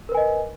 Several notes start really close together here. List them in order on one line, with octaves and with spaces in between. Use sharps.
A#4 B4 G#5 D#5